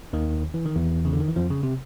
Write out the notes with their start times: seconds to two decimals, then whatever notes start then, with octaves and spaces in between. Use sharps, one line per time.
0.13 D#2 D#3
0.54 E3
0.66 D#3
0.76 E2 E3
1.05 C#3
1.13 D3
1.21 D#3
1.28 E3
1.36 F2 F3
1.50 C#3
1.63 C3